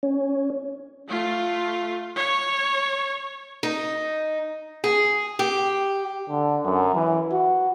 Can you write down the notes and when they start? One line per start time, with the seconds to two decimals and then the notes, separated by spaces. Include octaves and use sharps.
0.03 C#4
1.08 A3 F4
2.16 C#5
3.63 D#4
4.84 G#4
5.39 G4
6.29 D3
6.65 F#2
6.95 E3
7.32 F#4